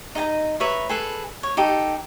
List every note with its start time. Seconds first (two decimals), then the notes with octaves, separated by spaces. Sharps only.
0.15 D#4 D#5 G#5 A#5
0.60 B4 C#5 E5 A#5
0.89 G#4 A4 B4
1.43 C#5
1.57 D#4 G4 A4